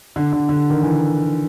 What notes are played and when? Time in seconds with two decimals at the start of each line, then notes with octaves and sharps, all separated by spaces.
0.16 D3
0.33 D3
0.49 D3
0.70 D#3
0.83 E3